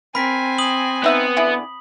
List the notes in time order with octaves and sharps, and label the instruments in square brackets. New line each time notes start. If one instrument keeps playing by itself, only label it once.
[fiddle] C4 G#5 [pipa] A#4 [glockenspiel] B5 B6
[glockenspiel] D#6 F#7
[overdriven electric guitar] B3 [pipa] D#4 E5 F#5
[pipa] D3 E4 G#4